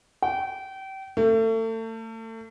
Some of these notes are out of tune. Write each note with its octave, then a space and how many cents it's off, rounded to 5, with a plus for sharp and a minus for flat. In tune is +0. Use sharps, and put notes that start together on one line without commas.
G5 -30
A3 +35